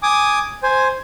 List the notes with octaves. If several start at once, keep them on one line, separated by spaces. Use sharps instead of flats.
G#5 D6 D#6
C5 G#5